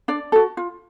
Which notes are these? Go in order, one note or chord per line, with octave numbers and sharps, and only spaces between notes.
D4 D5
F#4 A4
F4